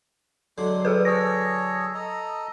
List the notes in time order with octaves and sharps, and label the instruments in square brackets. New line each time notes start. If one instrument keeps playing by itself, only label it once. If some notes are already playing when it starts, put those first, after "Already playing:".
[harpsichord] D3 F#3 D4 [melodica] G#3 C6
[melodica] G3 D#6 [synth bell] G#4 A4 B4
[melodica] G#4 A4 C#5 [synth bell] D#6 A#6
[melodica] A4 D#5 A#5